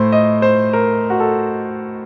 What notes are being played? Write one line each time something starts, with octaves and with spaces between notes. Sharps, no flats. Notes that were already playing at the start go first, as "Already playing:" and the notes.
Already playing: A2 C5
D#5
C5
A#4
F#4
A4